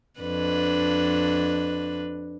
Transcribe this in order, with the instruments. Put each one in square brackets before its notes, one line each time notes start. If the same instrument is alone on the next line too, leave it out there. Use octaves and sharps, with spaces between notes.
[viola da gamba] F2 D4 B4